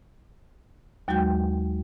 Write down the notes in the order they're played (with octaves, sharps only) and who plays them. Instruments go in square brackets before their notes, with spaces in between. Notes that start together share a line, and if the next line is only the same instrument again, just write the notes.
[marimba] D#2 F#3 G#3 F#4 G5 G6